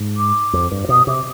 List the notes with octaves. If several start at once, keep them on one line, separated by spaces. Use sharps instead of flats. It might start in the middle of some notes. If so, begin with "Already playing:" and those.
Already playing: G#2
D6
F2
G2
B2 D#6
C3 D6